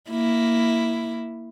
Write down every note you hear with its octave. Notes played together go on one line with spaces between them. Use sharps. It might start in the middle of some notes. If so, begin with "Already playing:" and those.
A#3 E4